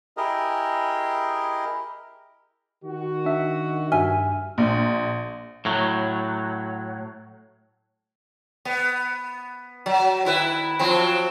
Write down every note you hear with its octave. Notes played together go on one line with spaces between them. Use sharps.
E4 G4 G#4 A#4 D#5
D#3 F#4
D4 E5
G2 E5 G#5 F6
A#1
A2 F#3
B3
F#3
D#3 E4 B4
F3 F#3 C4